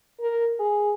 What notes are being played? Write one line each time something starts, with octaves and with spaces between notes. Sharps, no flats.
A#4
G#4